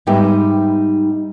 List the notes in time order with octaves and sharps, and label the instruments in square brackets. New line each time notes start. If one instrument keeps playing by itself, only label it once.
[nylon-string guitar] G#2 G3 B3 D#4 G4 E5